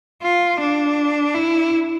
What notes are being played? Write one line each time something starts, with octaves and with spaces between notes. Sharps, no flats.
F4
D4
E4